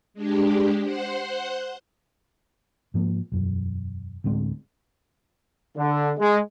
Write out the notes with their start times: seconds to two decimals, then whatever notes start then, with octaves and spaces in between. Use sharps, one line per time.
0.14 G#3 D4 G4
0.83 C5 F#5 C6
2.94 G#2 F3 A#3
3.32 E1 F#2
4.24 D2 A2 G#3 C4
5.77 D3
6.19 G#3